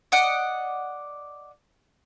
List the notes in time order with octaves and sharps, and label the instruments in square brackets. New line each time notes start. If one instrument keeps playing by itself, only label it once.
[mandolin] D5 D#5 F#5